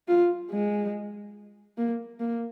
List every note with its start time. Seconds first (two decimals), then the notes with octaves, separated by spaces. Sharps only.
0.08 F4
0.51 G#3
1.78 A#3
2.20 A#3